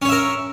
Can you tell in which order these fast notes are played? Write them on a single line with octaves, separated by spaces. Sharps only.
C#4 C#5 E5 A#4